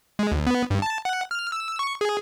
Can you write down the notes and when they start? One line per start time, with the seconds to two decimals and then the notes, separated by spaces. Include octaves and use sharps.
0.19 G#3
0.31 D2
0.47 B3
0.70 G2
0.82 A5
1.05 F#5
1.31 F6
1.52 E6
1.79 C#6
2.01 G#4